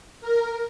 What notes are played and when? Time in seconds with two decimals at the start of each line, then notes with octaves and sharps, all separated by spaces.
0.21 A#4